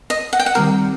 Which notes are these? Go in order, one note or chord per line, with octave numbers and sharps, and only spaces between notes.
D#5
F#5
G5
F#5
D#3 G3 C4 A#4